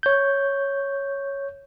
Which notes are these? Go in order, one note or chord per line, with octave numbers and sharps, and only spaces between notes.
C#5 G6